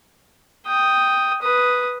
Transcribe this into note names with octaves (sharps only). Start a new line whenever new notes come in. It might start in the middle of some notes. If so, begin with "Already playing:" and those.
G5 D#6
B4 D#6